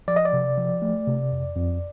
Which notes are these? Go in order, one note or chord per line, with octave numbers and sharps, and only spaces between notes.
F3 D5
D#5
D5
C3
F3
A3
C3
F2
F2